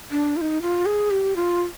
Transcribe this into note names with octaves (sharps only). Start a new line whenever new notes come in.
D4
F4
D#4
F4
G#4
G4
F4